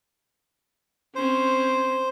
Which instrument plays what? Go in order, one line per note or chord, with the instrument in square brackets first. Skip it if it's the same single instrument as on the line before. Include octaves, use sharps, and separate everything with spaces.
[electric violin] C4 C#4 [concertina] C5